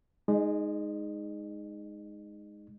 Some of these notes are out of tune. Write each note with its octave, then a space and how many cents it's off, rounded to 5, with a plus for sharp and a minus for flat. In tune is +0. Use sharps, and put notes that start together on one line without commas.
G#3 +0 D#4 +0 D#5 -40